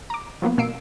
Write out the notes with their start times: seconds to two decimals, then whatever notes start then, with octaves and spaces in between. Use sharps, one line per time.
0.10 A#5 D6
0.42 F3 F#3 A#3 B3
0.58 B2 A#3 E6 C7 D7